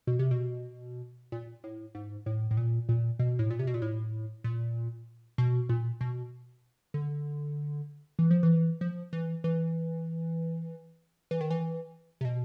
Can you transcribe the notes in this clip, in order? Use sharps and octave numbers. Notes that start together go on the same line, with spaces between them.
B2
C3
B2
A#2
A2
G#2
A2
A2
A#2
A#2
B2
A2
A#2
C3
B2
A#2
A2
A#2
B2
A#2
B2
D3
E3
F3
E3
F3
E3
E3
E3
D#3
E3
C3
B2